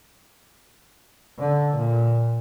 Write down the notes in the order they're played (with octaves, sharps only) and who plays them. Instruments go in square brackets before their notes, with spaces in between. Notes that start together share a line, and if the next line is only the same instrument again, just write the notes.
[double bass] D3
A#2